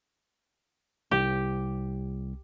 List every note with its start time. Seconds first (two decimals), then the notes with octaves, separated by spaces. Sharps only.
1.11 C2 G4